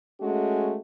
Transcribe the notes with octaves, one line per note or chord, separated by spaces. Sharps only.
G#3 A3 C#4 F#4